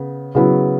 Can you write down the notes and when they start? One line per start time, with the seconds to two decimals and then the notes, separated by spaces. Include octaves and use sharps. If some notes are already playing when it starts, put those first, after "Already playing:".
Already playing: C#3 B3
0.35 C#3 F#3 B3 E4